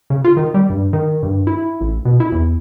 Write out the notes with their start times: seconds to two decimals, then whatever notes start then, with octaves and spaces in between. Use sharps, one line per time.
0.10 C#3
0.24 F4
0.37 D#3
0.54 G3
0.70 G2
0.93 D#3
1.23 G2
1.47 E4
1.81 A1
2.05 B2
2.20 E4
2.32 E2